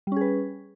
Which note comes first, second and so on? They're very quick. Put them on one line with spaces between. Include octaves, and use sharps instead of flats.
G3 C#4 G#4 B4